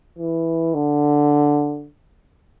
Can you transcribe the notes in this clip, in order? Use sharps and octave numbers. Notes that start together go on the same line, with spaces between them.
E3
D3